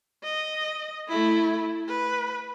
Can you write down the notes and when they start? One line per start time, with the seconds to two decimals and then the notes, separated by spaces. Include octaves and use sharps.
0.24 D#5
1.08 A3 E4
1.88 B4